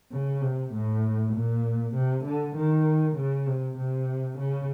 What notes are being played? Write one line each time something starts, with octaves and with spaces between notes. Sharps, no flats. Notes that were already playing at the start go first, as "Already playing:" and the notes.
C#3
C3
A2
A#2
C3
D3
D#3
C#3
C3
C3
C#3